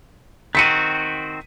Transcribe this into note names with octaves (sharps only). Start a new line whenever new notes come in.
D#3 C4 F#4 B6 C#7 D#7